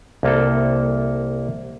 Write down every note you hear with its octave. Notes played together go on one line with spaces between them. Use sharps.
C2 A#3 A4